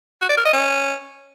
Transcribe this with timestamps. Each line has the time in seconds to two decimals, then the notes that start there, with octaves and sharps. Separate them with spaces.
0.22 F#4
0.29 D5
0.37 A#4
0.45 D#5
0.53 C#4